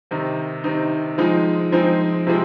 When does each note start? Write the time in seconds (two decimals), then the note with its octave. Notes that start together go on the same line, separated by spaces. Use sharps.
0.11 C3 D#3 C4 D#4
0.64 C3 D#3 C4 D#4
1.18 F3 G#3 C4 D#4
1.72 F3 G#3 C4 D#4
2.27 C3 F3 G#3 C4